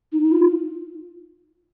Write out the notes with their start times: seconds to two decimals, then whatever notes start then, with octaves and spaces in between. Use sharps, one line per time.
0.12 D#4
0.24 D#4
0.32 F4